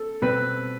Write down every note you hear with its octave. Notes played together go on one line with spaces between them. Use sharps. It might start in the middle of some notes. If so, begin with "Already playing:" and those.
Already playing: A4
B2 G3 C4 B4